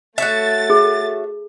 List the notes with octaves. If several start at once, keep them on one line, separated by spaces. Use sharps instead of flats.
A3 F#4 C#5 E5 A6
G#4